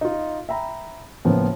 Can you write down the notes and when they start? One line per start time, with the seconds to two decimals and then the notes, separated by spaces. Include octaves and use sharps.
0.01 D#4 F4
0.49 E5 G5 A#5 B5
1.25 A2 C#3 F3 A#3 B3